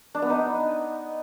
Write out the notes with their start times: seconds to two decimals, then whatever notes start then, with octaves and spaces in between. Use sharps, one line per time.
0.15 D4
0.22 B3
0.30 D#4